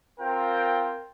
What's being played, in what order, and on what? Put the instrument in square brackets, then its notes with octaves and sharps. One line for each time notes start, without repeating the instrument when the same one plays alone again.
[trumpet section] C4 F4 A#4 G5